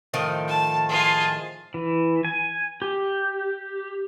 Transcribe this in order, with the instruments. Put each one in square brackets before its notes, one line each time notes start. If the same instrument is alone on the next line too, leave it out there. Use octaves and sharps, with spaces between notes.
[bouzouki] A2 D#3 F3
[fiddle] A5
[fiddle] F4 G#5 [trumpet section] G#4 A5 C6
[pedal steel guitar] E3
G#5
G4